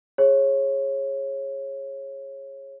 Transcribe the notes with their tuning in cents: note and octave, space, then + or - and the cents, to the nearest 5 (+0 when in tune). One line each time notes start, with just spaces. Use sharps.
G#4 +0 C#5 -25